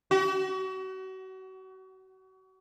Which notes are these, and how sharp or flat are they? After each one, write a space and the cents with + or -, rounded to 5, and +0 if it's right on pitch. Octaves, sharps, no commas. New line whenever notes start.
F#4 +35